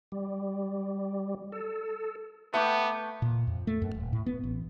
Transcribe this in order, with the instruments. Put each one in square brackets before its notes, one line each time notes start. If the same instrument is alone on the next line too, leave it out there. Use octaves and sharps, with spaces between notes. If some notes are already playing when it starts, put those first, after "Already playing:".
[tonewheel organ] G3
A4
[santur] A3 G5 D6 [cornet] B3
[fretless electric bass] A#2
F2
A3
F#2
D#1
A2
B3
A1